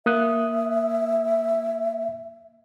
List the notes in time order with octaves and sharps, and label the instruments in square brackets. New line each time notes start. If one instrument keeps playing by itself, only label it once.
[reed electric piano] A#3 D#6 F#6 [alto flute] E5